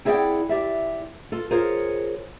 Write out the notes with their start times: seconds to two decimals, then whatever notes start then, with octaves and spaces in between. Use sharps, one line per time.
0.05 C4 E4 G#4 D5 F#5 G5
0.49 G4 D5 E5
1.32 F4 A4
1.51 F4 G#4 A#4 C5 C#5